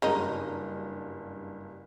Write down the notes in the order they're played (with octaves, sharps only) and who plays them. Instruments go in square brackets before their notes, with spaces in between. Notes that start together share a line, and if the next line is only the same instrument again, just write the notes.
[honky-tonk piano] F#1 G2 [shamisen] G#3 C#4 D#4